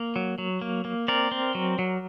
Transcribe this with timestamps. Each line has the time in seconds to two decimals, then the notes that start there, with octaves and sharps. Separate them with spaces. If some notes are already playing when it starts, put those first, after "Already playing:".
Already playing: A#3
0.16 F#3
0.38 F#3
0.61 A#3
0.85 A#3
1.08 C4 A#4 D5
1.32 C4
1.55 F#3
1.79 F#3